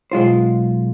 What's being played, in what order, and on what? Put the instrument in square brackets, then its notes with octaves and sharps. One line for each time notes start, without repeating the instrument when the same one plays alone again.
[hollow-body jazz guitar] B1 G#3 F4 C5